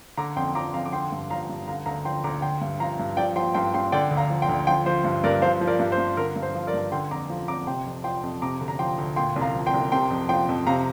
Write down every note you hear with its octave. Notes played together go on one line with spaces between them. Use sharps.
D3 A#5 D6
F2 G5 C6
F3 A#5 D6
F2 F5 A#5
D6
D3 G5 C6
G2
F3 F5 A#5
G2
D3 F5 A#5
D2 F5 A#5
F3 G5 C6
D2 A#5 D6
D3 G5 C6
G2
F3 F5 A#5
G2
F3 D5 G5
F3 G5 C6
G2 G5 C6
G2 G5 C6
D3 D5 G5
D2
F5 A#5
F3
G5 C6
D2
F3 G5 C6
F3 C5
G2
G2 A#4 D5
F3 C5 F5
F3
A#4 D5
G2
C5
G2
D3 A#4
G2
C5
F3
A#4 D5
G2
D3 G5 C6
F2 A#5 D6
F3
F2 A#5 D6
C3 G5 C6
F2
F3 G5 C6
F2
C3 A#5 D6
D2
A#5
F3 G5 C6
D2
A#2 G5 C6
C2
F5 A#5
F3
G5 C6
C2
C3 G5 C6
F2
F3 G5 C6
F2
C3 F5 A#5